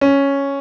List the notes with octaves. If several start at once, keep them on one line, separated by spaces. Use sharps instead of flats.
C#4